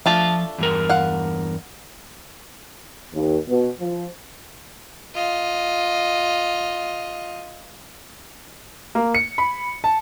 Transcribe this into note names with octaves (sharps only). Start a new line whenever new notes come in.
F3 A3 D4 F4 A5
E2 G2 A#4
F5 F#5
D#2
B2
F3
F4 D#5
A#3
C#7
B5
A5